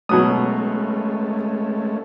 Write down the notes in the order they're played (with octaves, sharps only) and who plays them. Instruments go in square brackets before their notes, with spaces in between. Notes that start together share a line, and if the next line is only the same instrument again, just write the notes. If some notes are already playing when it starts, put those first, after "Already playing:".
[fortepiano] B2 F#3 D#6 [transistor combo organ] G#3 A3 C#4